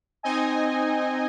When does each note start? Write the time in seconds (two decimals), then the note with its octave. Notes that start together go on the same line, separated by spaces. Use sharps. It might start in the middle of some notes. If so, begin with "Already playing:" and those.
0.23 C4 D#4 D#5 G#5